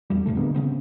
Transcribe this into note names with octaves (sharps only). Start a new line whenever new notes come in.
D1 E2 G3
E2 A2 C3 A3
D3 G#3 A#3 B3
C#3 B3 C4